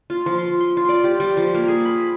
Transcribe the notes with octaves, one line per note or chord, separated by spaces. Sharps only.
F4
F3
C6
C6
F4
D5
G4
G3
F3
A#3
G#4
B5